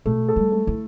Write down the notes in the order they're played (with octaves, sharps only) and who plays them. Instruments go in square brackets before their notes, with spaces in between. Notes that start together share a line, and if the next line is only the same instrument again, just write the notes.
[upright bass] B2 [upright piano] A3
[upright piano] A4
[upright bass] G3
[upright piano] A3
[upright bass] E4